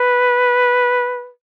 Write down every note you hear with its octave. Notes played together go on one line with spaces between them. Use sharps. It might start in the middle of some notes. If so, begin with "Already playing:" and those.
Already playing: B4